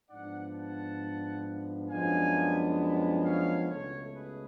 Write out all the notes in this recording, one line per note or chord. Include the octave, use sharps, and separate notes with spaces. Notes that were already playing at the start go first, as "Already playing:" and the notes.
G#2 F3 B3 D4 D5 F#5
F#5 A5
F#2 F3 G#3 B3 D4 F5 G#5
C#5 F5
C#2 B2 A3 A4 C#5
G#4 B4